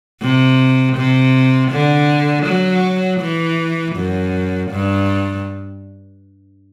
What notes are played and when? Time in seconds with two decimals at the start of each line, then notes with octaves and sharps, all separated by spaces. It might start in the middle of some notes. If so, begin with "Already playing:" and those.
0.21 C3
0.96 C3
1.71 D3
2.46 F#3
3.20 E3
3.96 F#2
4.71 G2